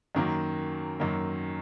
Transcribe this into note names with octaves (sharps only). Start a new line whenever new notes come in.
F#2 D#3 F#3 A#3
F#2 D#3 F#3 A#3